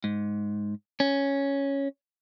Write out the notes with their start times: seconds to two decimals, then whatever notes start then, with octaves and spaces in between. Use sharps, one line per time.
0.04 G#2
1.00 C#4